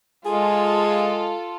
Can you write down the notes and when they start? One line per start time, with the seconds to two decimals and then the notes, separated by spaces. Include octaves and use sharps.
0.25 G#3 F4 G#4 A4